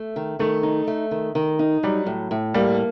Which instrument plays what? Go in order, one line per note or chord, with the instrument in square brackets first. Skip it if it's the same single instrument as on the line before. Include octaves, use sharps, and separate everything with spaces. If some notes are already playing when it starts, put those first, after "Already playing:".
Already playing: [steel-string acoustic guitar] A3
D#3
[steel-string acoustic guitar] D#3 [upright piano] A3
[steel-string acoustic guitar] D#4
A3
D#3
D#3
D#4
[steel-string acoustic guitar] F#3 [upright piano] G3
[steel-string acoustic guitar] A2
A2
[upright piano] G3 [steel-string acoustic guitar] A#3